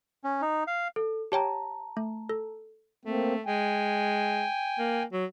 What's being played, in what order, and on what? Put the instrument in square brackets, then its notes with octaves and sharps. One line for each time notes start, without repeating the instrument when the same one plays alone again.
[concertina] C#4
D#4
F5
[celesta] A4
[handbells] G4 C#5 G5 [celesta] A5 A#5
[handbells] A3
A4
[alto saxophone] A3 [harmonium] A#3 C4
[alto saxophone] G#3 [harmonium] G5 G#5
[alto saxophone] A#3
F#3